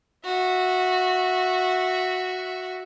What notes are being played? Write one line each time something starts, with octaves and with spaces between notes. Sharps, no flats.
F#4 E5